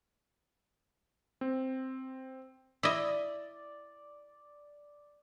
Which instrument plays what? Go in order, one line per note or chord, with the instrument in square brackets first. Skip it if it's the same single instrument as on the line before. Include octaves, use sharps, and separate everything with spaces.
[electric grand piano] C4
[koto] E4 D#5 [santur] D5